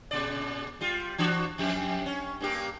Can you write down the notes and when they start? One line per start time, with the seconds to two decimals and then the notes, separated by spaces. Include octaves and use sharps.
0.11 A#2 C#3 D5
0.81 G3 F4
1.18 E3 D4 F#4
1.58 F2 G4
2.06 C#4
2.41 G2 A#3 G4